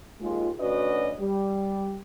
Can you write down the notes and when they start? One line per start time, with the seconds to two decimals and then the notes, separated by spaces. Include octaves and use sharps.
0.21 D#2 G#3 F4
0.60 D2 C#4 F#4 B4 D5 D#5
1.19 G3